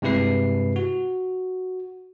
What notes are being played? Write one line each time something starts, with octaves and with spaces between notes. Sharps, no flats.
G2 C3 G#3 E4 B4 C7
F#4